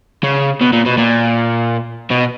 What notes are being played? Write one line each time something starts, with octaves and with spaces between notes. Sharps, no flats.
C#3
B2
A#2
B2
A#2
B2